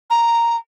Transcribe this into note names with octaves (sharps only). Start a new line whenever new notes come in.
A#5